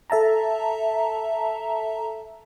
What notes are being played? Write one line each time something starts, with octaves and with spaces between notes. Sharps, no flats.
A4 E5 A5 A#5